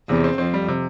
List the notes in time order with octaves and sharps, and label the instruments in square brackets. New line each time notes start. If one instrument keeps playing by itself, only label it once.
[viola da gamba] E2 [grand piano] C3
[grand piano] C4
[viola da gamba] F2 [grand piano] C4
[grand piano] G3
C3